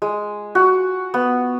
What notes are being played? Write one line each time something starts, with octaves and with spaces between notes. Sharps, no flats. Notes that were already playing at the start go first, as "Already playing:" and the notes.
G#3
F#4
B3